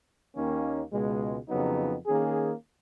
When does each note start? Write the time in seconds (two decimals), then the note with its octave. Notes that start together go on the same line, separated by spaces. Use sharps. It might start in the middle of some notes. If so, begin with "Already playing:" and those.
0.36 D#2 D#3 A#3 C#4
0.92 C#2 B2 G#3
1.49 F2 C#3 F#3 B3 D#4
2.06 D#3 A#3 C#4 G#4